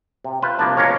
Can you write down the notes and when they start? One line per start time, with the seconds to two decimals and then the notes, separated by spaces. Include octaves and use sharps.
0.24 C3
0.42 F4 B4 C5
0.59 C2 F3 A#3 D4 D5 A5
0.77 C#2 A#3 C#4 A#4 C#5 F5